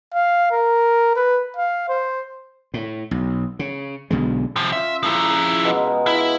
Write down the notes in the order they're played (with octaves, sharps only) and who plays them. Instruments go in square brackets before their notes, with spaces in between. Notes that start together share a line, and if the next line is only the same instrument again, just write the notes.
[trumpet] F5
A#4
B4
F5
C5
[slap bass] A2
B1
C#3
B1 B2 D3 G#3
[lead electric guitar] C3 F3
[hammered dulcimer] C#4 F4 [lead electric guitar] E5
[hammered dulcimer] C#3 A#3 [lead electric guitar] F3 E4
[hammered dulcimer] B2 G#3
G#3 D#5
[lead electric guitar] E4 [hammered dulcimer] F4